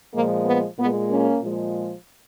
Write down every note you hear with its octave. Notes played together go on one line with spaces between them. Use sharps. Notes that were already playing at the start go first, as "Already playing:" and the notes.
A#2 F3 G#3 A#3
B3
A#2 G#3 B3
A#3 C#4
A#2 F3 G#3